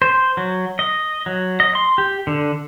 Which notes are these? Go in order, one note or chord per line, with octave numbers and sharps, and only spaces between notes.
C5
F#3
D#5
F#3
D#5
C6
G4
D3